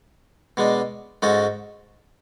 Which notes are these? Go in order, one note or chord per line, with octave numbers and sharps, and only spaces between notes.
B2 G#3 D4
G#2 G#3 C#4 F#4 A4